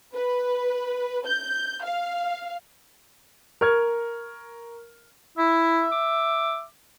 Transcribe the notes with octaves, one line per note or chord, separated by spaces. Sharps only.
B4
G6
F5
A#4 C#6 F6 G#6
E4 E5
D6